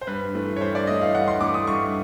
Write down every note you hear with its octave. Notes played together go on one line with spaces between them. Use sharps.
C5
G2 B4
E3 A3
C#5
G2 C5
D5
E3 A3 D#5
F5
G2 F#5
C6
E3 A3 D6
D#6
G2 C#6